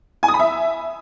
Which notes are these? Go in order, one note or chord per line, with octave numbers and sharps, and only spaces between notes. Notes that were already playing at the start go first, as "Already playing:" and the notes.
G#5
D#6
B5
E5